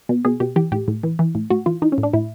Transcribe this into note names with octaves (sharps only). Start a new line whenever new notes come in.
B2
B2 G#4
B2 G4
E3 G4
A2 G4
A2
E3
E3
A2
A2 F#4
E3 F4
E3 D#4
C#4
A2
D4
A2 E4